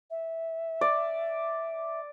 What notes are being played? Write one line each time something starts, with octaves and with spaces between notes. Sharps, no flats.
E5
D5